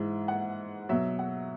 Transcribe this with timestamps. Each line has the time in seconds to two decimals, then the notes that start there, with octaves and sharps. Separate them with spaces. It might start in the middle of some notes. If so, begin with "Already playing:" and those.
Already playing: G#2 E3 G#3 E5
0.28 F#5
0.89 B2 F#3 E5
1.19 F#5